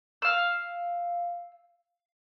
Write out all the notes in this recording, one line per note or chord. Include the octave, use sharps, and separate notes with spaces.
F5 E6